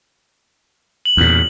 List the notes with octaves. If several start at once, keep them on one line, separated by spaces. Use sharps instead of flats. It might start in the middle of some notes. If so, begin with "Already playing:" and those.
F#7
E2 A#2